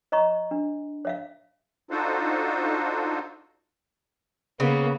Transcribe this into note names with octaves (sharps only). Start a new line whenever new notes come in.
C#5 D#5 A#5 C#6
D4
C#5 E5 F5
D4 D#4 F4 F#4 A4 C5
C#3 A#3 B3